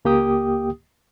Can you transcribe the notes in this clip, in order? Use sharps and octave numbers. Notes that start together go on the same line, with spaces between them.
C#2 A#3 G4 G5 D#6